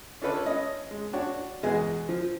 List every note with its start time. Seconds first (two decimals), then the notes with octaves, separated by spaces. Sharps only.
0.22 C#4 D4 F4 A4 B4 C#5
0.46 C#4 D#5
0.91 G#3
1.13 D4 F#4 C#5
1.63 E2 B2 G#3 G#4 D#5 G#5
2.09 F3